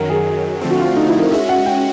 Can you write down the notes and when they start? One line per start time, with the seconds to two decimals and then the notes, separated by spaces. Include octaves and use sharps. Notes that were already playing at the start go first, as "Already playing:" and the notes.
Already playing: F#2 D#3 F#3 A#4
0.10 G#4
0.61 D3 F3 A3 C4
0.70 F#4
0.80 F4
0.96 D#4
1.09 E4
1.19 A#4
1.31 G#3 C#4 F#4 E5
1.49 F#5
1.66 G5